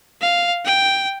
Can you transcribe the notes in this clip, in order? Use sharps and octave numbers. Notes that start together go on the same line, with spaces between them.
F5
G5